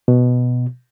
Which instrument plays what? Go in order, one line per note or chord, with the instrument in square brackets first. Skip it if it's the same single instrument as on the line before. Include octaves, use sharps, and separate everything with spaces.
[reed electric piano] B2